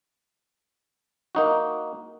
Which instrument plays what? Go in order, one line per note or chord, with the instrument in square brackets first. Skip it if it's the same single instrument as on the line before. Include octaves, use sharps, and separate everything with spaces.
[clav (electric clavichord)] A#3 D#4 F#4